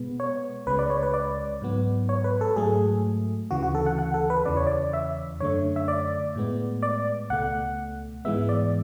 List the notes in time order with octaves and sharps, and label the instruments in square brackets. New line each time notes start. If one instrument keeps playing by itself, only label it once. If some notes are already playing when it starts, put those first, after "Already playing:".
Already playing: [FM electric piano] B2 G#3 B3
C#5
C#2 C#3 G#3 B4
D5
C#5
B4
D5
G#2 F#3 B3
C#5
B4
A4
G#2 F#3 A3 G#4
D2 C#3 E3 F#4
F#4
A4
F#5
F#5
A4
B4
E2 C#3 E3 D5
C#5
D5
E5
F#2 D3 A3 C#5
E5
D5
A2 G#3 B3
D5
C#2 B2 A3 F#5
G#2 E3 G#3 B3 E5
D5